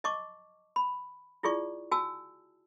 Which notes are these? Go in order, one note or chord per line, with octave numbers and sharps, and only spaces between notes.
D#5 A5 C#6 D6
B5
E4 F4 G#4 D5 C#6
F#4 G#5 A5 E6